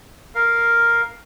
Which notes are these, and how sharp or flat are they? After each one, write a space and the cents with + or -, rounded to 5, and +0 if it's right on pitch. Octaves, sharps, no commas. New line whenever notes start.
A#4 +0 F5 +0